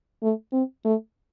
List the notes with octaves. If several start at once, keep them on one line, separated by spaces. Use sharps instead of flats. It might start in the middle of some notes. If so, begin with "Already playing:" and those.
A3
C4
A3